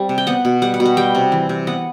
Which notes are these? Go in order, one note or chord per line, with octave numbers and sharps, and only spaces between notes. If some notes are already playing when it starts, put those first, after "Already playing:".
Already playing: G3 C4
C3
G5
B3 F#5
B2
G3 F#5
F#5
B2
F#5
G3 G5
C3
E3
C3
B3 F#5